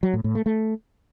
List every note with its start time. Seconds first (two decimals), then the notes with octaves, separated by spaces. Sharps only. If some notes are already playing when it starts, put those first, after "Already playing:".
0.03 F#3
0.14 A2
0.24 A2
0.35 A3
0.46 A3